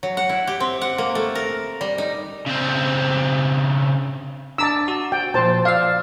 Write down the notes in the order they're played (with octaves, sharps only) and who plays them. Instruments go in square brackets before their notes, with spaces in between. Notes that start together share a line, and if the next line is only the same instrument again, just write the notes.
[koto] F#3
F#5
E4
G4
C4
F#5
A#3
A3
A#4
G3
D#4
[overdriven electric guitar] C#3 C4
[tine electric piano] D4 D6 [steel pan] A5 A#5 E6
[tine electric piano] F#4
[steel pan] G5
[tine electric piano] A#2 F3 [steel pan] C5 A5
[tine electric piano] D5 E6 [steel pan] F5